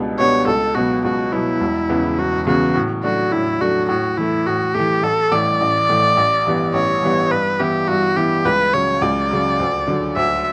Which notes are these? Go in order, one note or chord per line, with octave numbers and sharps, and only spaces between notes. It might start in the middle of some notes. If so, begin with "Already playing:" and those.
Already playing: C#2 B2 G3 B3 D4
B2 G3 B3 D4 C#5
C#2 A4
B2 F#3 B3 F#4
C#2 F#4
B2 F#3 B3 E4
E1
E2 C#3 E3 B3
E1 F#4
E2 C#3 E3 B3 F#4
A2
F#3 A3 D4 F#4
A2 E4
F#3 A3 D4 F#4
A2 F#4
E3 A3 E4
A2 F#4
E3 A3 G4
A1 A4
A2 E3 A3 D5
A1
A2 E3 A3
A1
G2 E3 G3 B3
A1 C#5
G2 E3 G3 B3
G2 B4
E3 B3 E4 G4
G2 F#4
E3 B3 E4 G4
C#2 B4
C#3 F#3 C#5
C#2 D5
C#3 F#3
D2
D3 F#3
D2 E5